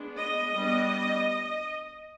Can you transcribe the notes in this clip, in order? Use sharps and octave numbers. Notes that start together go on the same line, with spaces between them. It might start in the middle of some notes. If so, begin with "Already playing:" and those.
Already playing: G#3 B3 D4
D#5
G3 B3 D4